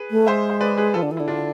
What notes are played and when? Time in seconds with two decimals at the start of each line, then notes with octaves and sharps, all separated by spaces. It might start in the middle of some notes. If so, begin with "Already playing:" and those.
Already playing: G#4 B4
0.11 A3
0.27 G#3 C5 E5
0.50 C5
0.60 B4 D5
0.77 G#4 B4
0.94 F3 F4 A4
1.02 D3
1.11 E3
1.17 D3 E4
1.28 D4 F4